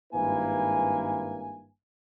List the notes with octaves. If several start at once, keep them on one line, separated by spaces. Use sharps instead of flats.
G#1 G2 A#3 E4 B4 G#5